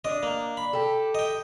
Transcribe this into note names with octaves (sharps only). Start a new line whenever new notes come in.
D4 D5 D#5
A#3
B5
G4 A4
D#5 G5